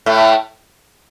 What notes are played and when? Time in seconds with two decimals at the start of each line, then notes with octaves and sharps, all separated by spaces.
0.06 A2 A3